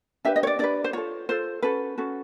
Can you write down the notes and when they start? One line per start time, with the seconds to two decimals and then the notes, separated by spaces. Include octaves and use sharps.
0.25 D4 G4 B4 E5
0.36 D#5
0.43 C#5
0.47 D5
0.59 D4 G4 B4 D5
0.84 C5
0.93 F4 A4 C#5
1.29 F4 A4 C5
1.62 C#4 F#4 A4 B4
1.98 C#4 F#4 A4